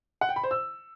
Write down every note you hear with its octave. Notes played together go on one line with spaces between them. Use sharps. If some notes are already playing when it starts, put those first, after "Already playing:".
F#5
G5
B5
C5
E6